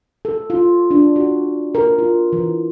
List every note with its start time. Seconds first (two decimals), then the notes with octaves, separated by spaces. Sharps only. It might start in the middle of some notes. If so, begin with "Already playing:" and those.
0.25 A4
0.50 F4
0.91 D4
1.16 F#4
1.75 A#4
1.98 F4
2.33 E3